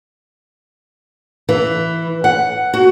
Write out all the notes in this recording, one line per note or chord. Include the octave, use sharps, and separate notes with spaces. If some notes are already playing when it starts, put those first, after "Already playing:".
E3
F#5
F#4